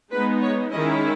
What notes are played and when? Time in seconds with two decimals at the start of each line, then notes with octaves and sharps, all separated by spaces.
0.12 G#3 B3 D#4 B4
0.42 C#5
0.72 D#3 G#3 C#4 E4 D#5